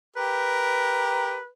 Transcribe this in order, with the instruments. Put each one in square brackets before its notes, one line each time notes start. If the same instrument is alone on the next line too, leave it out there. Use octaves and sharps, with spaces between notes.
[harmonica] G4 A#4 [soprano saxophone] B4